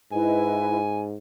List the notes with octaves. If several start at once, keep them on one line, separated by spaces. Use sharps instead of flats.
G#2 E4 B4 D#5 G#5